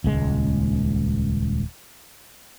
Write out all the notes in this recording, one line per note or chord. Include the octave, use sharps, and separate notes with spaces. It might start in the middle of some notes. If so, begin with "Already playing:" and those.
D#1 C#2 G#3